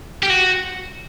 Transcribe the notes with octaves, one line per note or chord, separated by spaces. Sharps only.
G4
F#4